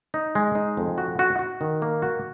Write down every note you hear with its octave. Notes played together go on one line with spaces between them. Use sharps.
D#4
G#3
D#4
F2
F#4
F#4
F#4
D#3
A#3
F#4